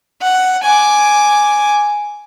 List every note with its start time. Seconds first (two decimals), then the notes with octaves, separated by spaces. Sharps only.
0.21 F#5
0.63 G#5 D6